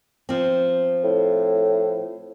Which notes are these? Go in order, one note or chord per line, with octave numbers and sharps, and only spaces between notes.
F3 C4
A2